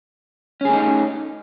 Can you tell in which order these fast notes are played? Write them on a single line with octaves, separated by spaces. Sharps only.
C#4 G#4 A3 D#4